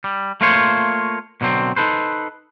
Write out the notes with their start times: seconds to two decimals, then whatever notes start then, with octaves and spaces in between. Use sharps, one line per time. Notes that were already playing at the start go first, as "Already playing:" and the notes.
0.04 G3
0.41 A3 A#3 F4 C5 C#5
1.41 B2 D3 F#3 C4
1.76 D#4 A4 B4 C5